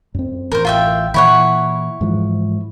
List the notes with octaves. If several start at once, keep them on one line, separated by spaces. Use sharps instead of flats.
F#2 C4
A1 A#4 C5
F4 E5 G5
A#2 E3 E4 C#5 F#5
G#2 E3 F3